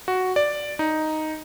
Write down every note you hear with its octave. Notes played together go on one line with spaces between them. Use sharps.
F#4
D5
D#4